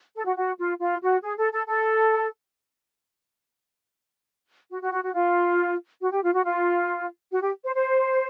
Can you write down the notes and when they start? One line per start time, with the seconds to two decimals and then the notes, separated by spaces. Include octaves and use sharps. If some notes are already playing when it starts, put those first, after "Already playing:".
0.15 A4
0.25 F#4
0.36 F#4
0.58 F4
0.80 F4
1.02 F#4
1.23 G#4
1.38 A4
1.52 A4
1.66 A4
4.71 F#4
4.82 F#4
4.93 F#4
5.03 F#4
5.14 F4
6.01 F#4
6.11 G4
6.23 F4
6.33 F#4
6.44 F4
7.31 F#4
7.42 G4
7.64 C5
7.75 C5